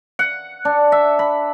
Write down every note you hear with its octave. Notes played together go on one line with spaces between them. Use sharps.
F#5
D4
E5
B5